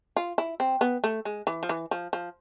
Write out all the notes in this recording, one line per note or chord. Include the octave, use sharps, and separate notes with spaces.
F4
E4
C4
B3
A3
G#3
E3
F3
E3
F3
F3